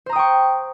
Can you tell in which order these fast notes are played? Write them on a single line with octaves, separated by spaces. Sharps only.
C5 A#5 D#6 G5 C#6